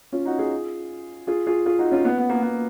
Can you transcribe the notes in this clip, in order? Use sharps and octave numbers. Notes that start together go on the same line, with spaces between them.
C#4 F4
D#4 F#4
F4 G#4
F4 G#4
F4 G#4
F4 G#4
D#4 F#4
C#4 F4
B3
B3
A#3
B3